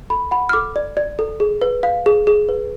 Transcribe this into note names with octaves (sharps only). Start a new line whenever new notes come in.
A4 B5
F#5 B5
F6
A4 D6
D5
D5
A4
G#4
B4
F5
G#4
G#4
B4